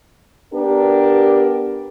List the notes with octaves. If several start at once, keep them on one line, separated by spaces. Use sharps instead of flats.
B3 D4 G4 A#4